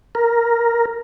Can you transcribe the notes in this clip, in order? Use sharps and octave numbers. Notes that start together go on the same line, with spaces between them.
A#4